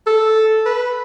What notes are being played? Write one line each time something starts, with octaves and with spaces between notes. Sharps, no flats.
A4
B4